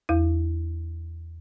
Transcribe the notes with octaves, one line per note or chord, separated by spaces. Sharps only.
E2 E4